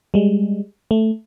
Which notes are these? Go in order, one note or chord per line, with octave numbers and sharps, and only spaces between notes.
G3 G#3
A3